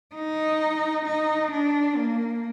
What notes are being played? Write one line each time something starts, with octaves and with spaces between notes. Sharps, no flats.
D#4
D#4
D4
A#3